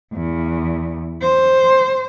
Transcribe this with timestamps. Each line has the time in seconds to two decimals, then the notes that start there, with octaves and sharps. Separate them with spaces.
0.13 E2
1.22 C5